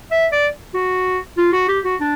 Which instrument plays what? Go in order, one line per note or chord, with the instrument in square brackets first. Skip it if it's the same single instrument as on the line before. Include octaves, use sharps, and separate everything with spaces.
[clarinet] E5
D5
F#4
F4
F#4
G4
F#4
D4